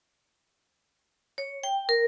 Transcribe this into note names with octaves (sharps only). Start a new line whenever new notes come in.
C#5
G5
A#4